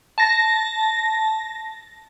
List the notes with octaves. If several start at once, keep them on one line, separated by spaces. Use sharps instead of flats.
A5 A#6